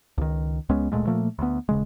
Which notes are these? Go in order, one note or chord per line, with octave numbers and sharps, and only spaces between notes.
C#2 D#3
C#2 G#3 B3 C#4
D1 A#2 G#3 A3
A#2 F3 A3 A#3
D2 B3
D#1 C#3 G#3